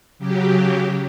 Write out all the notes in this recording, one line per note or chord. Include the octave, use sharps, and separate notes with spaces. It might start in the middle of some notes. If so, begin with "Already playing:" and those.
C#3 F#3 G4